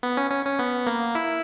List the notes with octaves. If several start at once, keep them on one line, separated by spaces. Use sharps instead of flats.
B3
C#4
C#4
C#4
B3
A#3
E4